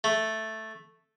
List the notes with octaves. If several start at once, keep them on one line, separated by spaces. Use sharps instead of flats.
A3